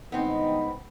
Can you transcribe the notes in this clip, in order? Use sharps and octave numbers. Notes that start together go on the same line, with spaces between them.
G1 G#3 B3 C4 D#4